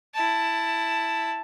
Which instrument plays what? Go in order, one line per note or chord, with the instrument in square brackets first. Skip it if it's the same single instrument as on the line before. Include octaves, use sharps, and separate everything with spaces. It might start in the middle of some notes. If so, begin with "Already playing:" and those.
[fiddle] E4 A5